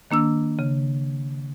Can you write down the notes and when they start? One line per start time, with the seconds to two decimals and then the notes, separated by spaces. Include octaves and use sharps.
0.11 D#3 A#3 D4 E6
0.59 C#3